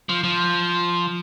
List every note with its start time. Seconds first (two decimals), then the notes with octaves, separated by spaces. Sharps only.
0.09 F3
0.24 F3